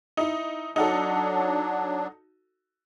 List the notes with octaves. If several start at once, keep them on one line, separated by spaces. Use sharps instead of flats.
D#4 E4
F#3 D4 D#4 F#4 A4